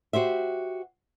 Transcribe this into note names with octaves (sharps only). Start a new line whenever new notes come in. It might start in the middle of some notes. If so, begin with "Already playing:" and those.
F#4 G4 C5 E5